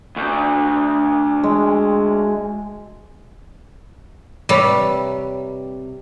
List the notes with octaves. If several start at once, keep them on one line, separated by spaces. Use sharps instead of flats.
D2
G#3
C3 G3 B4 C#5